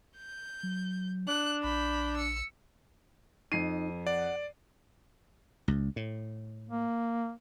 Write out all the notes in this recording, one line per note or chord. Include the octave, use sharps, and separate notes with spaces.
G6
F#3
D4 F#6
A#1 B5 G6
E6 C#7
F2 D#4 C7 D#7
D5 F#5
C#2
A2
A#3